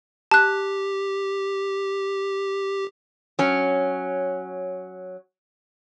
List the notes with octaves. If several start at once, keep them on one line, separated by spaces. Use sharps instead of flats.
G4 A5 F#6
F#3 C#4